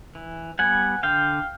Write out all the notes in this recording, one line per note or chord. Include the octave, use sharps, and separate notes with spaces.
E3
G3 B3 F#5 G#5
D3 F5 G5